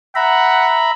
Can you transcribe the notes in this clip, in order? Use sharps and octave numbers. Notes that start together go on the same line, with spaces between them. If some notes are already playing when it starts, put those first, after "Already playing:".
E5 F#5 A#5 B5